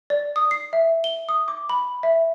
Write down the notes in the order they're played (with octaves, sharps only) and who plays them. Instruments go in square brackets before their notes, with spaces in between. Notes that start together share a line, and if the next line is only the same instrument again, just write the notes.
[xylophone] D5
D#6
C7
E5
G7
D#6
D6
B5
E5